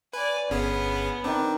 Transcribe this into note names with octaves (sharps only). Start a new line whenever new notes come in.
B4 D5 G#5
G1 B3 C#4 G#4
D#3 C4 D4